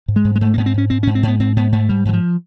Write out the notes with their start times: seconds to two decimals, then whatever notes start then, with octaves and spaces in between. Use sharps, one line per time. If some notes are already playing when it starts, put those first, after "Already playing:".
0.08 G#2
0.16 G#3
0.25 G#2
0.36 G#3
0.41 G#2 A3
0.54 A#3
0.58 G#2 B3
0.66 C4
0.74 G#2 C#4
0.90 G#2 C4
1.03 G#2 C#4
1.15 C4
1.23 G#2 B3
1.40 G#2 C4
1.56 G#2 B3
1.72 G#2 A3
1.89 G#2 G3
2.05 G#2 E3
2.13 F3